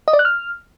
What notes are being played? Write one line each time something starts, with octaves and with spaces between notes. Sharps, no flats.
D#5
D5
F#6
F6